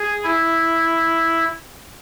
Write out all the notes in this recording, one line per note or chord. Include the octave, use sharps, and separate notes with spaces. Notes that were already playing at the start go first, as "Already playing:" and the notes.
Already playing: G#4
E4